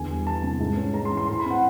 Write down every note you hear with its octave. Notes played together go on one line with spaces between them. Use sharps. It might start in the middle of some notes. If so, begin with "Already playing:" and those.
Already playing: E2 D3 G#5
G3
E3 A5
C3
G#2
C#4
G#3 A#5
C6
E3
C6
A2 C6
B5
C4 F#5